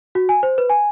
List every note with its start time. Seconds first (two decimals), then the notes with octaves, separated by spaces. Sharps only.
0.15 F#4
0.29 G#5
0.43 C5
0.58 B4
0.70 G#5